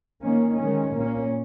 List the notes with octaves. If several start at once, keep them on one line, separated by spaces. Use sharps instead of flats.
D#3 A#3 C#4
D#3 G#3 C#4
A#2 A#3 C#4